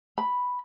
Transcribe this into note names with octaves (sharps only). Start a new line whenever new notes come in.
B5